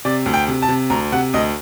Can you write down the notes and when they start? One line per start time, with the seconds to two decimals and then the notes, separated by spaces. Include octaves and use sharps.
0.05 C3 D5
0.26 D2
0.34 G5
0.48 C3
0.62 A5
0.69 C3
0.90 D2 A#5
1.12 C3 F#5
1.34 D2 D#5